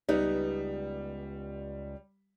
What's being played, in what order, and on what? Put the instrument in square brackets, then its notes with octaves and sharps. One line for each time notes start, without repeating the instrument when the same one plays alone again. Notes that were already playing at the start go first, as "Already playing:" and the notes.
[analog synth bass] C#2 [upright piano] G3 [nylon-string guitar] B3 D#4